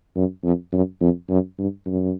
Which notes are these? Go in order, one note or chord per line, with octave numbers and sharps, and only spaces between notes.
F#2
F2
F#2
F2
F#2
G2
F#2